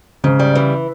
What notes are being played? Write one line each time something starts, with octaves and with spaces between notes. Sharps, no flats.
G#2 C#3
G3
E3